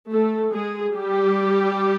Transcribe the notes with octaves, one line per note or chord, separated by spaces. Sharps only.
A3 A4
G#3 G#4
G3 G4